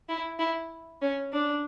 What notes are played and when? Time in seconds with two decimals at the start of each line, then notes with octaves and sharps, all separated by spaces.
0.09 E4
0.39 E4
1.02 C#4
1.33 D4